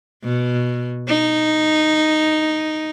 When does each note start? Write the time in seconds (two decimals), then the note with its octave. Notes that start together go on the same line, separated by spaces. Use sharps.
0.24 B2
1.07 D#4